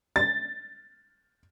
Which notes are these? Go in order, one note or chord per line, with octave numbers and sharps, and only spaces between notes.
A6